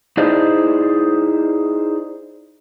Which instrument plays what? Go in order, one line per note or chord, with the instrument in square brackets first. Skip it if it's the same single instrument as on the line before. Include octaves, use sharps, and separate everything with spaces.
[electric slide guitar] D#4 E4 G#4 C5 D5 D#5